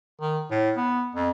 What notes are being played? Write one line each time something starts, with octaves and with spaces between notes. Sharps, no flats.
D#3
A2
B3
F2